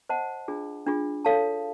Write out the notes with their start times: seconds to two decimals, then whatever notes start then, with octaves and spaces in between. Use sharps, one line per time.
0.09 C5 D#5 F#5 A5
0.48 D4 F4 G#4
0.87 D4 F4 G#4
1.25 A4 C#5 F5 A5